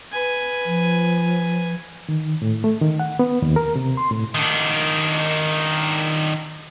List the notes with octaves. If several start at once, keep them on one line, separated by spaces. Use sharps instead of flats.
B4 G#5
F3
D#3
A2
A3
D#3
F#5
B3
D#2
A#4
C3
C6
A2
D#3 D4